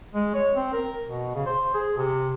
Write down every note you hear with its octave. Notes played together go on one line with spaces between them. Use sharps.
G#3
C#5
C4
A#4
B2
C#3
C5
G#4
C3